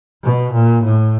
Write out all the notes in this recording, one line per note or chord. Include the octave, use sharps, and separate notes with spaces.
B2
A#2
A2